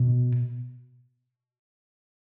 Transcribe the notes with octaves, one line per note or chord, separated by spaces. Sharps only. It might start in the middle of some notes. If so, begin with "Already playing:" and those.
Already playing: B2